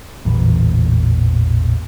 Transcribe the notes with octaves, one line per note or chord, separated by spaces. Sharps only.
A1 E2 A#2 E3